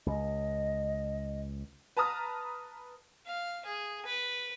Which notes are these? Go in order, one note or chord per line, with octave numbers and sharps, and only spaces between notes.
C#2 D#5
B4 A5 A#5 D#6 F6
F5
G#4
B4